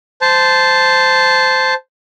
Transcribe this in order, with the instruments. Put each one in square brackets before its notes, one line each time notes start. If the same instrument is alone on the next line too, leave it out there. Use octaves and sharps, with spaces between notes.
[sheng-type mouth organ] C5 A5